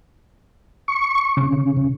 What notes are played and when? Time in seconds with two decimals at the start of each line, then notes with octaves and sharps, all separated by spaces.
0.88 C#6
1.37 C#3